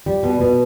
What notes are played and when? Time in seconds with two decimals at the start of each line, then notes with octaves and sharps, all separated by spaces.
0.06 G3
0.23 B2
0.41 B2